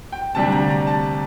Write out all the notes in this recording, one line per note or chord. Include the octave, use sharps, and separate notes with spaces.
G5
D2 C3 G3 D4 A5
A#5
A#5
A5